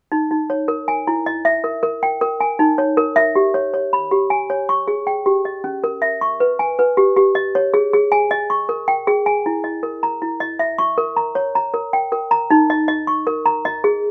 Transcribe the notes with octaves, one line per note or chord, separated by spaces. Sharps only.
D#4
D#4
C#5
A#4
G#5
E4
D#5
E5
A#4
A#4
G5
A#4
G#5
D#4
C#5
A#4
E5
G4
C#5
C#5
B5
G4
G#5
C#5
C#6
G#4
G5
G4
D#5
C#4
A#4
E5
C#6
B4
G#5
B4
G4
G4
D#5
C#5
G#4
G#4
G#5
D#5
C#6
A#4
G5
G#4
G#5
E4
D#5
A#4
A#5
E4
D#5
E5
C#6
A#4
A#5
C#5
A#5
A#4
G5
A#4
A#5
D#4
D#5
D#5
C#6
A#4
A#5
D#5
G#4